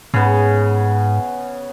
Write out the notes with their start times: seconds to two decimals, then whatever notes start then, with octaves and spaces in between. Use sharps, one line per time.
0.14 G#2 C#3 B3